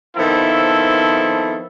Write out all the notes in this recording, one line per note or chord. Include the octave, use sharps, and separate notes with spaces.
D#3 F3 B3 C4 E4 A4